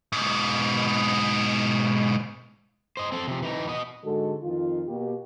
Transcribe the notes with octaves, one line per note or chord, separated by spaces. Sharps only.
G#2 B2
C5 D#5
C4 A4
C3 F3
E3 D#4
B3 D#5
G#2 D3 G#3 F#4 A4
F2 D#3 F4
B2 A#3 G4